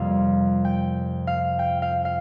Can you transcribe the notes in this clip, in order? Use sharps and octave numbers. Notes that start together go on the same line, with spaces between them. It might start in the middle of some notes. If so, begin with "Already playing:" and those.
Already playing: F2 C3 G3 A#3 F5
G5
F5
G5
F5
F5